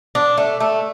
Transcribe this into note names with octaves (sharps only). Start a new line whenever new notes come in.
D4
A3
A3